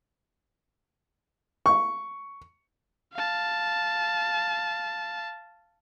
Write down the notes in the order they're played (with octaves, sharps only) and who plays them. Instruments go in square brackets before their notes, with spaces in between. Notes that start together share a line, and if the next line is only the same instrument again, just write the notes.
[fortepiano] C#6
[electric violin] F5 A5